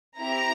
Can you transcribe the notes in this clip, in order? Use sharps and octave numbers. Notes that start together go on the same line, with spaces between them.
C4 E4 G4 A#5